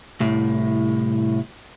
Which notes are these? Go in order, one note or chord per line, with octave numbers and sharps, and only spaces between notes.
C2 A2